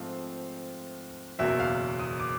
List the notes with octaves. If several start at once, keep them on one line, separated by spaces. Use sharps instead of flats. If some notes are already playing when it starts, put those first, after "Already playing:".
Already playing: G#2 F3 A3 C4 F5
F#1 E2 B2 F#3 A#3 E5
F5
D#6
D6